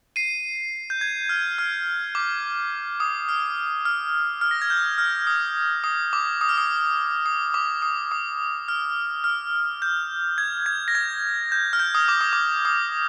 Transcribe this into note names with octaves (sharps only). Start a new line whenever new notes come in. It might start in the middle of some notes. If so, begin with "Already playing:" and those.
C7 D#7
G6
G#6
F6
F6
D6
D#6
F6
F6
F6
A#6
G#6
G6
F6
D#6
D#6
D6
D#6
F6
D#6
D#6
D6
D#6
D#6
F6
F6
G6
G#6
G#6
A#6
G#6
G6
F6
G6
D#6
D6
D#6
D6
D#6